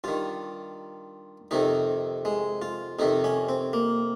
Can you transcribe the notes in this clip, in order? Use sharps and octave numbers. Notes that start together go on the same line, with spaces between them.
G2 D#3 F4
F2 C3 D#3 D#4
G#3
F4
F2 C3 D#3 D#4
C#4
C4
A#3